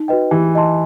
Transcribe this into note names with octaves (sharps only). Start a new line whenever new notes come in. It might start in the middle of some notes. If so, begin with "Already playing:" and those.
Already playing: D#4
F#4 B4 D#5 G5
E3 G4
D#5 A5 C6